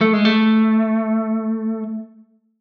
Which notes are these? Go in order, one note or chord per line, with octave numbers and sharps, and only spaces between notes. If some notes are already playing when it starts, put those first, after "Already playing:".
A3
G#3
A3